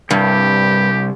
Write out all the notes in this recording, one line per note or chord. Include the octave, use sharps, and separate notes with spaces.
C2 G2 G4